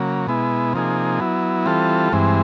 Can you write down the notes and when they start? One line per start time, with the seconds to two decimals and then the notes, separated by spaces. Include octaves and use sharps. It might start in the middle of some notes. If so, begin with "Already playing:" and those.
Already playing: C#3 F#3 A#3
0.27 B2 G#3 B3 E4
0.73 C3 F3 A#3 D#4 G#4
1.20 F#3 B3 E4
1.66 E3 G3 C4 F4 A4
2.13 G2 E3 G#3 C4